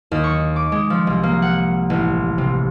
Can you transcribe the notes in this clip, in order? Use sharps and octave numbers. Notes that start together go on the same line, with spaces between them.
D#2
C#6
D6
G#3
F3
C2
A#3
F#5
A1
C3